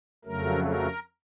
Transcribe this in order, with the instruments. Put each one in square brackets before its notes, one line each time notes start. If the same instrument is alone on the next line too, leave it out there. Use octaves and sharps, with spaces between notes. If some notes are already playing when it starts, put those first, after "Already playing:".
[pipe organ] F2 C#3 F#3 A3 A#4
A#4